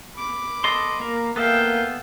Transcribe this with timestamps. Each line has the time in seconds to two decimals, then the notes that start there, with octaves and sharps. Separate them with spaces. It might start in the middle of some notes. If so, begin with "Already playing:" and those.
0.16 B5 D6
0.64 A4 D#5 C6
1.00 A#3 A#4
1.36 A#3 B3 A4 E5 F5 G5